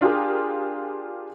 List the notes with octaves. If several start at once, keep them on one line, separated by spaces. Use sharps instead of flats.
D4 F4 G4 G#4 A#4